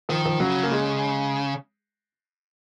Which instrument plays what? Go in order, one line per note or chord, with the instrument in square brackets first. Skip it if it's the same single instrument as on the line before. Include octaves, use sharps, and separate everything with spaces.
[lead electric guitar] D#3 [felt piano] F3
[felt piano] F3
[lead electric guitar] C#3 [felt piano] F#3
[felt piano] A#3
G#3